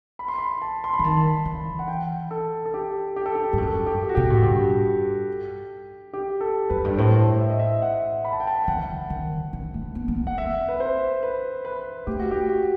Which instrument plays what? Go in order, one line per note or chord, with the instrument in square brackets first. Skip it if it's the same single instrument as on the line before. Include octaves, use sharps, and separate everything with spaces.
[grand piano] B5
C6
B5
A5
C6
B5
[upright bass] E3
[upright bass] D#3 [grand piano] A5
[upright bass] E3
[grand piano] F#5
G5
A4
A4
G4
G4
A4
G4
[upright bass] G2
[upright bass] F#2 [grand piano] A4
[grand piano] G4
F#4
[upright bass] B2 [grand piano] G4
[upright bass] A2
[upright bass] G2 [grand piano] G4
[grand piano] G4
A4
[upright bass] F#2 [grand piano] B4
[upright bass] G2
[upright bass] A2 [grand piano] C5
[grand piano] E5
D#5
E5
E5
F#5
B5
A5
G5
A5
G5
[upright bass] E3 [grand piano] F#5
[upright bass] D#3
E3
A3
B3
B3
C4
[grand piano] F#5
[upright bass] C4 [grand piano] E5
[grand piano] B4
C5
B4
B4
[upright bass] A3 [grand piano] G4
[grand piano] F#4
G4
F#4